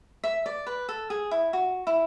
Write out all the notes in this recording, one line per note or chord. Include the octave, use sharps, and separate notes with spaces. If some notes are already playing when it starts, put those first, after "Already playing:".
E5
D5
B4
A4
G#4
E4
F#4
E4